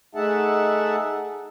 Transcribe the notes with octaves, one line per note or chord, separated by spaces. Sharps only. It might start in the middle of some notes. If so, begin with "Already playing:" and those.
A3 D#4 G#4 E5 F#5 A5